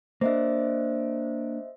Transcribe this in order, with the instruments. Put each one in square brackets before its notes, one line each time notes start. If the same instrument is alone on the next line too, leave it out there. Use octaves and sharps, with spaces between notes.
[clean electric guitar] A#3 D4 [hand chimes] C5 D#5 E5